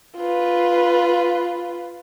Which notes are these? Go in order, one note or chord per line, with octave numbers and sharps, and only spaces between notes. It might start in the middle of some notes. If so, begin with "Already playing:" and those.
F4 B4